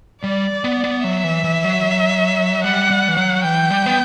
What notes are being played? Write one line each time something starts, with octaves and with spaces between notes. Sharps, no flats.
G3 D5
B3
B3
F#3 E5
E3
E3
F#3
G3 F#5
G3
E3
F#3
E3 G5
G3
B3